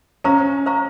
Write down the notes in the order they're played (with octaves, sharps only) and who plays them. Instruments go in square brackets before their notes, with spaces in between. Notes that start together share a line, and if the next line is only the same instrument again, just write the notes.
[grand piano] C#4 [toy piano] C5 F5 A#5 C#6
[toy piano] C5 F5 A#5 C#6